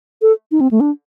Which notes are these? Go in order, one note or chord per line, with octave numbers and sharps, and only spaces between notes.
A4
D#4
C4
A3
D4